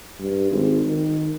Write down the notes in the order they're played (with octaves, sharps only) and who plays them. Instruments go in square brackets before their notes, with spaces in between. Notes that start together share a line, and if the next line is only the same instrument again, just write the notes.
[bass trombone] G2
G#1
D#3